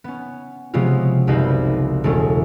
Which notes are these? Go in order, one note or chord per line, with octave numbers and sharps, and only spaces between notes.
B3 C#4
C3 F3 G#3 B3 C#4 F4
F#1 C2 D#4 B4 C5
E1 G#3 A3 C#4